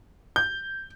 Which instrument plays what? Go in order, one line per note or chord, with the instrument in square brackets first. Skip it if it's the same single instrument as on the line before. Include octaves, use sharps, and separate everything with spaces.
[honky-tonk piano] G6